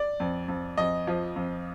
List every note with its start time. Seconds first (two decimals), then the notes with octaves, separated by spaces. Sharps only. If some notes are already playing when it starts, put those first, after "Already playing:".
Already playing: D5
0.20 F2
0.48 F2
0.77 F2 D#5
1.07 F3
1.36 F2